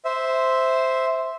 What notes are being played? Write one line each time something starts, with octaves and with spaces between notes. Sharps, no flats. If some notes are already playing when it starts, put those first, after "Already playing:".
C5 E5